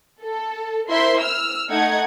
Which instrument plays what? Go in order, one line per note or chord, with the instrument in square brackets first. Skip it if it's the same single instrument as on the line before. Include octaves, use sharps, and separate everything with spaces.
[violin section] A4
E4 A#4 C5 E5 C6
E6 F6
A3 D#4 F#5 G#6